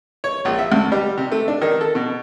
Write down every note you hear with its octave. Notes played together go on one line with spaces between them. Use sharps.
C#5
A#1
E5
D2
G3
C3
A3
D4
D#3
A4
B2